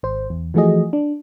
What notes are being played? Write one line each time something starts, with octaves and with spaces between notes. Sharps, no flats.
G#1 C5
E2
E3 F3 A3 F#4 G#4 D#5
D4